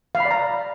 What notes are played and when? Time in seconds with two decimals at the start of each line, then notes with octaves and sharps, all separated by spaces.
0.15 F5
0.20 B5
0.25 D5
0.31 A#5